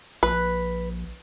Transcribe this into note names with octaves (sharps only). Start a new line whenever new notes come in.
A#1 B4